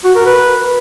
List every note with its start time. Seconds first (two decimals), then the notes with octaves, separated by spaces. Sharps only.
0.05 F#4
0.15 A#4
0.26 B4